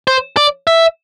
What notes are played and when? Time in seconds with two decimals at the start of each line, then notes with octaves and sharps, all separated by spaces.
0.07 C5
0.37 D5
0.67 E5